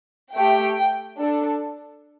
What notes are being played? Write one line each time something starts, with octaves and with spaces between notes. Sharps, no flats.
A3 G4 G5
D4 A4